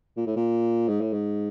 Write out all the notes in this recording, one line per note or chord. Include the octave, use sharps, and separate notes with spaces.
A#2
A2
A#2
G#2
A2
G#2